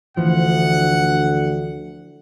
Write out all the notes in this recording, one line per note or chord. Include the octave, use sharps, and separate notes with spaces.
D2 E3 F3 F#5